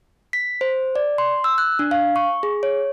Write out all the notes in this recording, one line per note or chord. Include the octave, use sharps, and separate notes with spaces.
B6
C5
D5
C6
E6
F#6
D4
F5
C#6
G#4
C#5